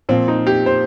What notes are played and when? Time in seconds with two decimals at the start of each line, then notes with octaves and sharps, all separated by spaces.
0.09 A#2 F3 C4
0.28 D#4
0.47 G4
0.66 C5